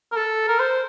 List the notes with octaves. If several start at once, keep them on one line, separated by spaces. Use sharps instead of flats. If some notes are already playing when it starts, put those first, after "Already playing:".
A#4
A4
A#4
C5